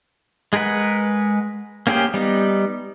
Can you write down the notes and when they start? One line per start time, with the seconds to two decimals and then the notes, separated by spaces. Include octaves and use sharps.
0.53 G#3 G#4 A#4 B4 F#5
1.87 A#3 C#4 G4 G#4 C5
2.14 G3 B3 D#4